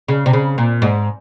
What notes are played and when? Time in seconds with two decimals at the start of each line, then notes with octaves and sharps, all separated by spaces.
0.08 C#3
0.26 C3
0.33 C#3
0.58 A#2
0.82 G#2